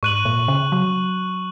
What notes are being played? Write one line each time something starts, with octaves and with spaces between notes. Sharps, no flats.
G#2 C#6 F#6 D#7 F#7
A#2
C#3
F#3